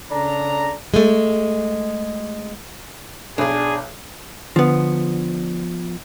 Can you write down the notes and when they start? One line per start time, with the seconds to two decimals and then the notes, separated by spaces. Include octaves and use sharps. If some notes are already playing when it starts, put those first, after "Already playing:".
0.11 C#3 D4 A4 A#5
0.94 G#3 A3
3.38 B1 D4 G#4 C#5 D5
4.56 D3 F3 B3